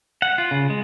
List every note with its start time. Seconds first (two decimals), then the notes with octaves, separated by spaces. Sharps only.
0.22 F#5
0.38 F4
0.51 C#3
0.70 G#3